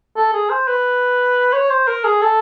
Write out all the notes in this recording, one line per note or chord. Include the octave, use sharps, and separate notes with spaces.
A4
G#4
C5
B4
C#5
C5
A#4
G#4
A4